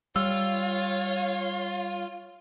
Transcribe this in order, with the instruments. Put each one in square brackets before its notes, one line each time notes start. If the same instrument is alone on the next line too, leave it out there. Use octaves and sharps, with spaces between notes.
[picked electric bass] G3 [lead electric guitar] F4 [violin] C#5 [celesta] E6